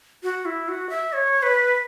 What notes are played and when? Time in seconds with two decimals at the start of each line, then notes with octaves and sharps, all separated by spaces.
0.23 F#4
0.45 E4
0.68 F#4
0.90 E5
1.13 C#5
1.43 B4